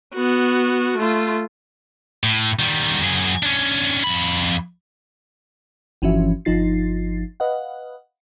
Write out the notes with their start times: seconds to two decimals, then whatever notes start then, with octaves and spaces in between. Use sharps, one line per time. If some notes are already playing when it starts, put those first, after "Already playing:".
0.15 B3 F#4
0.97 A3 F4
2.24 A2
2.59 D#3 G3
3.02 F#2 G#4
3.43 C#4 D4
4.04 F2 B5
6.02 G1 E3 F3 C#4 F#4 E5
6.45 G1 F3 D#4 F4 A6 C7
7.40 B4 D#5 F5 F#5